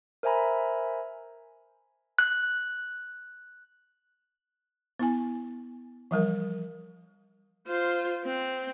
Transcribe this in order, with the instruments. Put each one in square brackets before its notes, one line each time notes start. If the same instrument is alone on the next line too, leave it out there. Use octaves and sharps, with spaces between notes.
[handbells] A#4 C5 E5 G#5 A#5 B5
[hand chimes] F#6
[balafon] B3 E4 G#5
E3 F3 G3 A#4
[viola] F4 C5
C4